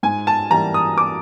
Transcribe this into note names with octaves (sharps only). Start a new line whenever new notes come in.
G#2 G#5
A5
E3 G3 A#3 A#5
D#6
D6